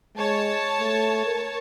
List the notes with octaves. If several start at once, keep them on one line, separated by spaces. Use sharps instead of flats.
G#3 C#5 A5
A3
A#4